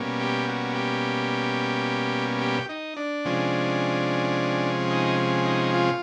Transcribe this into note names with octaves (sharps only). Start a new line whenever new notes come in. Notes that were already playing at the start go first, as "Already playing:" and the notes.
Already playing: B2 G3 A#3 C#4
G4
F#4
G4
G4
D#4
D4
C3 F3 G#3 C#4
D#4
D#4
F4